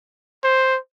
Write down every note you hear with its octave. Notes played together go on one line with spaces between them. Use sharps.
C5